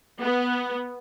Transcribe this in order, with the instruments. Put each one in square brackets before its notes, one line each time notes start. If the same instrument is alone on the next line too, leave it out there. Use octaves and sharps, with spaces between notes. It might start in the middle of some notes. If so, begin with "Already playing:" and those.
[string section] B3